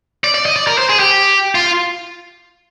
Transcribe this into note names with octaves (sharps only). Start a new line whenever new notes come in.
D5
D5
D#5
D5
A#4
C5
G#4
G4
F4